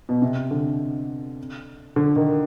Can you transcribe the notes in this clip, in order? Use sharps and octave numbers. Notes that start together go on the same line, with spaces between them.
B2
C3
D3
D3
D#3